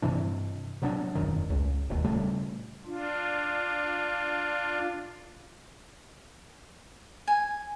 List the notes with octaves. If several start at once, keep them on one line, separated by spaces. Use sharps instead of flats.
G2 C3 E3 D4
C3 F#3 B3 D4
E1 F#2 D#3
C#2
E1 D#2
A#2 C#3 G3 A3
D4 F4
G#5